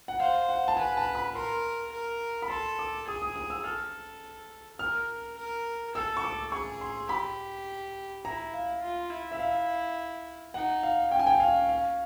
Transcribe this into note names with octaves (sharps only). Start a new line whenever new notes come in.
F#5
C5 F5
F#5
A5
B4 G#5
A5
B5
A#4 C6
A#4
B5
A4 C6
D6
G#4 D#6
D#6
D#6
E6
A4 F6
A#4 F6
A#4
A4 E6
C#6
D6
G#4 C#6
C6
G4 B5
E4 A#5
F5
F4
E4
E5
F5
D#4 F#5
F5
C#4 G5
G#5
G5
F5
F5